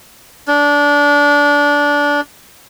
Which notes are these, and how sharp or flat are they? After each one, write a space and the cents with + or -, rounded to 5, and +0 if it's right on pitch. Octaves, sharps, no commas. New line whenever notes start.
D4 -20